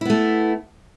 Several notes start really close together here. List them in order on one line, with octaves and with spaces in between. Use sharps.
E4 B3 A3